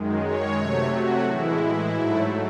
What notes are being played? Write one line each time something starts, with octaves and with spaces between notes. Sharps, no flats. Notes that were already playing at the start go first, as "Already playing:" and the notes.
Already playing: F#2 D#3 G#3
C#5
C3 F#3 A3
F#4
A2 E3 G#3 E4
G#2 F#3 A3